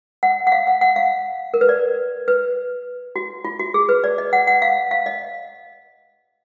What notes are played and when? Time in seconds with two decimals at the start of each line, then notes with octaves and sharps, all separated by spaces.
0.23 F#5
0.47 F#5
0.52 F5
0.67 F#5
0.81 F#5
0.96 F5
1.54 A#4
1.61 B4
1.69 D5
2.28 B4
3.16 F#4
3.45 F4
3.59 F#4
3.74 G#4
3.89 B4
4.04 D5
4.18 D#5
4.33 F#5
4.47 F#5
4.62 F5
4.91 F5
5.06 D#5